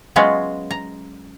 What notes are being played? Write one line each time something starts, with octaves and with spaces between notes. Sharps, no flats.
F#3 G#3 B3 C#4 F4 F#4
A#5